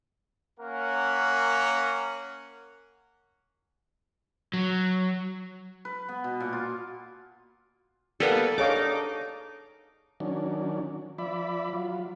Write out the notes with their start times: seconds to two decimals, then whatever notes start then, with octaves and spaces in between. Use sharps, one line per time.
0.60 A#3 C#4 A#4 F#5
4.54 F#3
5.85 B4
6.08 B3
6.24 B2
6.40 A#2
6.53 F4
8.20 G3 A#3 B3 A4
8.58 D4 D#4 G#4 C#5 F5 D6
10.20 D#3 F#3 C#4 D4
11.18 F3 D5 E5 B5
11.73 F#3 F4